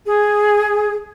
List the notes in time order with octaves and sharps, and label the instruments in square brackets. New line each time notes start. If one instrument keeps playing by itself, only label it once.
[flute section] G#4